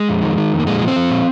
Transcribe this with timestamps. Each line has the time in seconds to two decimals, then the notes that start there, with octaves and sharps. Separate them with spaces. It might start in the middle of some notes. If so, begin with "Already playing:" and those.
Already playing: G#3
0.09 F2
0.22 D#3
0.38 D#3
0.52 F2
0.59 A#3
0.66 A#2 G#3
0.82 F3
0.88 C4
0.96 F3
1.10 A#2